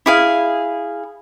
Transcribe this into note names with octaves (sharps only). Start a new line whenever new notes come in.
E4 G#4 F5